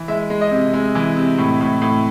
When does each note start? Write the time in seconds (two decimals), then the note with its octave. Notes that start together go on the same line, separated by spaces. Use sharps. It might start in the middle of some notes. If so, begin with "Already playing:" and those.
Already playing: E3
0.08 G#3 E5
0.30 G#3
0.41 D#5
0.51 C3
0.74 G#3
0.95 E3
1.16 C3
1.38 A2
1.61 A2
1.82 A2